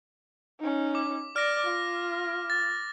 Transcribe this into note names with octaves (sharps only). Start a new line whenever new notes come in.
C#4 D#4
D6
D5 F6 A#6
F4
A6